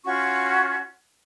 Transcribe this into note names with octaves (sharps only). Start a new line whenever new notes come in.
C#4 F4 F#4 C#6